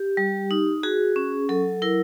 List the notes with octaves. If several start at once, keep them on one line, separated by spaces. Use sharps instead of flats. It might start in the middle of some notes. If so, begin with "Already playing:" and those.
Already playing: G4
G3
D#4
F#4 G#4
C#4
F#3 A4
E4 A#4